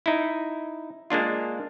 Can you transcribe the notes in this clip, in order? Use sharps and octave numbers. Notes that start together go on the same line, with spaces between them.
D#4 E4
G#3 A#3 D4 F4